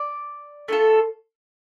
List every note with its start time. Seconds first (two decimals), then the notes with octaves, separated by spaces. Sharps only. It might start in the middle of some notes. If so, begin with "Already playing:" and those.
Already playing: D5
0.68 A3 D4 F4 A4